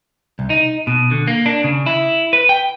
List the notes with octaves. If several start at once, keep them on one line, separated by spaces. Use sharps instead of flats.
C2
D#4
B2
D3
A#3
D4
C#3
E4
B4
G5